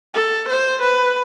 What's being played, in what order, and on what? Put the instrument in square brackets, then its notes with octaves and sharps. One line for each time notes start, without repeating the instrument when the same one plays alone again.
[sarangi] A4
C5
B4